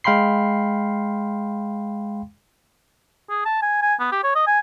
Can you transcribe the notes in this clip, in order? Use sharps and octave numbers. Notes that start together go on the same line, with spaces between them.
G#3 F5 G5 B5 C6 C7
G#4
A5
G#5
G#5
B3
G4
C#5
D#5
G#5